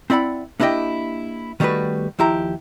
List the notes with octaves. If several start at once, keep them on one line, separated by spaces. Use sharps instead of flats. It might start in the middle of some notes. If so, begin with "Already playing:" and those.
C4 E4 D5 F#5 B5
A#3 D4 E4 G4 D#5 G5
D#3 G3 A3 B3 F#4 B4
D#2 F3 E4 G4 A#5